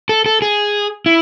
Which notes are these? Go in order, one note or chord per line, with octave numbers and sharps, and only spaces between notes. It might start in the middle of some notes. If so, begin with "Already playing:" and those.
A4
A4
G#4
E4